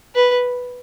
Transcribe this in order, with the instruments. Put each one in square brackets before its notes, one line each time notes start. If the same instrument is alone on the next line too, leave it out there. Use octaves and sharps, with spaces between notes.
[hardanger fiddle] B4